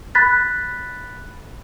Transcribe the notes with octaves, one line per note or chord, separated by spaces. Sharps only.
B5 F#6 A6 B6